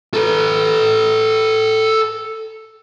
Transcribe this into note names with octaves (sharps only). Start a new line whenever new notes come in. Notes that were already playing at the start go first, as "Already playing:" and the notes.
A4 B4